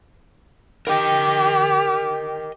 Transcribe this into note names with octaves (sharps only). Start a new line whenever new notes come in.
G4 A#4 D#5 G5